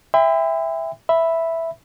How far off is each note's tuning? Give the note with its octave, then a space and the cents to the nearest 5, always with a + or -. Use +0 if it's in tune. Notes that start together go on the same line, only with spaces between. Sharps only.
E5 +0 G5 +40 B5 +45
E5 +0 B5 +0